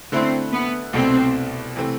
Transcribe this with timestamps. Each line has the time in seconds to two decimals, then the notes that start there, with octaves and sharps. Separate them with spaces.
0.12 D3 A3 C4 E4
0.52 B3
0.93 C2 B2 A3 C4
1.76 C3 E3 A3 C4